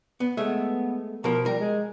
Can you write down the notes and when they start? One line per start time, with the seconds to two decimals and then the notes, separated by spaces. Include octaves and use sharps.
0.20 B3
0.37 G#3 A3 B3 E5
1.24 B2 F3 A#4
1.46 G3 A#4
1.60 G#3